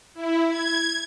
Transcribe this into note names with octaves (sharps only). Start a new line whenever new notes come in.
E4
G#6